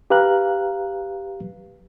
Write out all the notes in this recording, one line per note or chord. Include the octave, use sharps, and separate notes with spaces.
G4 B4 F5 A#5 F#6